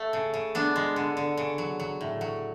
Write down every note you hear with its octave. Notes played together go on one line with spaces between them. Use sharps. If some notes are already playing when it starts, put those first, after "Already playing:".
Already playing: A3
C#3
C#3
B3 D4
G#3
D3
D3
C#3
F#3
F#3
A2
F#3